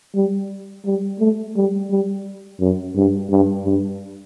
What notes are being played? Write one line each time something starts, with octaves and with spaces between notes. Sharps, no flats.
G3
G3
A3
G3
G3
F#2
G2
G2
G2